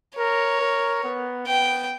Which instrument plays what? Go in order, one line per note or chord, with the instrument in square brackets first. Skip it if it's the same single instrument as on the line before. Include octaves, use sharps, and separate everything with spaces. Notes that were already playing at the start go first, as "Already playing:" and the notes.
[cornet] A#4 [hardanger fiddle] C#5
[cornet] A#4
B3
[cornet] B3 [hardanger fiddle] G5